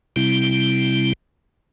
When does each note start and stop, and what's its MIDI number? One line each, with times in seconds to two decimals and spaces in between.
0.16 1.13 48
0.16 1.13 55
0.16 1.13 60
0.16 1.13 64